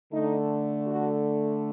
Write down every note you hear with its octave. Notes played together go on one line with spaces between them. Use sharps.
D3 A3 D#4
F#4